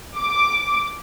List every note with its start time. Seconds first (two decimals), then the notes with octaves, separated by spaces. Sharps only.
0.17 D6